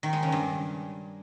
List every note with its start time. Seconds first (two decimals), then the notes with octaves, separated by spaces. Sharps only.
0.03 D#3
0.13 G#3
0.23 C#3
0.32 G2